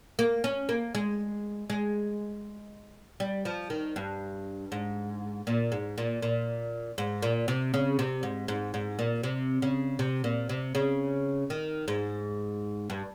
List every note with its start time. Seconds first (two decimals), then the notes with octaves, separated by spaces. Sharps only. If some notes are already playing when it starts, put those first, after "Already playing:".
0.19 A#3
0.44 C#4
0.69 A#3
0.95 G#3
1.70 G#3
3.20 G3
3.45 F3
3.70 D#3
3.96 G2
4.72 G#2
5.47 A#2
5.72 G#2
5.98 A#2
6.22 A#2
6.98 G#2
7.22 A#2
7.48 C3
7.74 C#3
7.99 C3
8.23 G#2
8.48 G#2
8.74 G#2
8.99 A#2
9.23 C3
9.62 C#3
9.99 C3
10.24 A#2
10.49 C3
10.75 C#3
11.50 D#3
11.88 G#2
12.90 G2